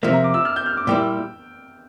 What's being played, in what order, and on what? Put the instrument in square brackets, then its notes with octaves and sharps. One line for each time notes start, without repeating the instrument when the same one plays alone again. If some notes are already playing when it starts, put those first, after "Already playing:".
[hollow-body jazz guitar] C3 F3 A#3 [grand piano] E5
[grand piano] A#5
D6
E6
F6
G6
F6
D6
[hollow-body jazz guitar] A#2 G3 A#3 E4 [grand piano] G5